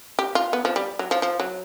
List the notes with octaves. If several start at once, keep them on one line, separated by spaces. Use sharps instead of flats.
G4
F4
B3
F3
G3
F#3
F3
F3
F#3